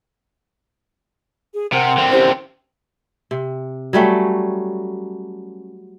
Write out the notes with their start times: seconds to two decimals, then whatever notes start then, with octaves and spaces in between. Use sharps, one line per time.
1.54 G#4
1.72 C3 C4 A#4 F#5
1.98 D3 C4 F5 G5
2.11 C#4 E4 G4 C5
3.31 C3
3.93 F#3 G3 A3 C#4